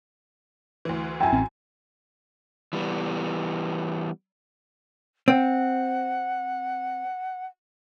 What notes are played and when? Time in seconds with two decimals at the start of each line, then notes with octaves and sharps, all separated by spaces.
0.85 D2 E3
1.20 F#2 E4 G5 G#5
1.32 A1 C4
2.73 E3 G3 B3
5.28 C4 F#5